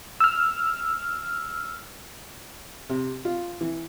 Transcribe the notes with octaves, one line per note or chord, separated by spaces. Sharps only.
E6 F6
C3
F4
E3